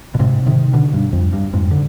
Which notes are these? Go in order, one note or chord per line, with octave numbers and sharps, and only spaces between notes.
B2
G#2 C3
C3 D#3
B2 D3
G2
F2
G2
F2 G#2
D3